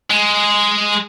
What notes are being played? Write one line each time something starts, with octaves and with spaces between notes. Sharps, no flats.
G#3